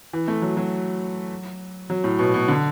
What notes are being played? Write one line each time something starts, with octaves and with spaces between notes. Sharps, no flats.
E3
A3
F#3
F#3
F#3
A2
B2
B2
D3